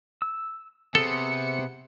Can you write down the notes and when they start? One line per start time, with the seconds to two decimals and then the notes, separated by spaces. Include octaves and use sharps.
0.22 E6
0.95 C3 B3 G#4 A4 C#7